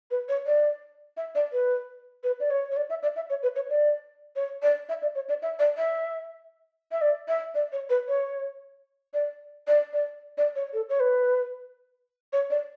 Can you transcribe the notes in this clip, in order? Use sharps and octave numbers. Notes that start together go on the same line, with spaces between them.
B4
C#5
D5
E5
D5
B4
B4
D5
C#5
C#5
D5
E5
D5
E5
C#5
B4
C#5
D5
C#5
D5
E5
D5
C#5
D5
E5
D5
E5
E5
D5
E5
D5
C#5
B4
C#5
D5
D5
D5
D5
C#5
A4
C#5
B4
C#5
D5